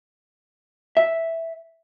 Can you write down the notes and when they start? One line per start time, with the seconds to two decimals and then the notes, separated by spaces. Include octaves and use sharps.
0.97 E5